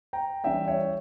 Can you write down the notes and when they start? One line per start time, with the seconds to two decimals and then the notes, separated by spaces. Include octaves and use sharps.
0.13 G5 A#5
0.44 E3 G3 C#4 E5 G5
0.68 C#5 E5